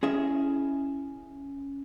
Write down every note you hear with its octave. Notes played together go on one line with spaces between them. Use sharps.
C#4 E4 G#4 D#5 E5